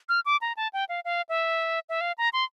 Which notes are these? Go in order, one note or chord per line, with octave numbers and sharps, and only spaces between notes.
F6
D6
A#5
A5
G5
F5
F5
E5
E5
F5
A#5
C6